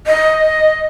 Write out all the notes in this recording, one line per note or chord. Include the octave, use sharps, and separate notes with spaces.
D#5